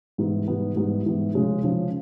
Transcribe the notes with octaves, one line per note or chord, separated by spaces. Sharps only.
G#2 E3 G3 B3
G#2 E3 G3 B3
G#2 E3 G3 B3
G#2 E3 G3 B3
C#3 F3 G#3 C#4
C#3 F3 G#3 C#4